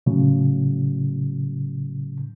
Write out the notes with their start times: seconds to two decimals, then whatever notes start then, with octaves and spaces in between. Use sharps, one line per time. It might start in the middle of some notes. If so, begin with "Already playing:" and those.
0.06 A2 C#3 F#3